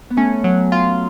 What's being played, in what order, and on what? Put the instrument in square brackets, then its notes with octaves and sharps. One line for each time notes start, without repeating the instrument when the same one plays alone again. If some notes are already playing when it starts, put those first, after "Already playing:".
[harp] B3
[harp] A3 [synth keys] C#4
[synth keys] F#3
F4